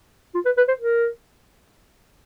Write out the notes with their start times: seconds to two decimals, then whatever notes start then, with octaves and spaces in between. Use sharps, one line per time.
0.34 F4
0.46 B4
0.57 B4
0.68 C5
0.80 A#4